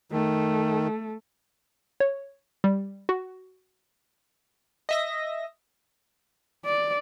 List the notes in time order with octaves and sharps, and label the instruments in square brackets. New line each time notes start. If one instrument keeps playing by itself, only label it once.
[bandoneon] D#3 [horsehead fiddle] A3
[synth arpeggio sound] C#5
G3
F#4
[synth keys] D#5 E5 A#6
[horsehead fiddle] D5